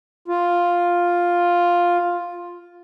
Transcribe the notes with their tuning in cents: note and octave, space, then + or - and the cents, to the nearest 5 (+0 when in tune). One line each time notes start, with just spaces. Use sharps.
F4 +5